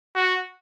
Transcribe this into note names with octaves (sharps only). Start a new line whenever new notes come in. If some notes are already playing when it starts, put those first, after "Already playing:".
F#4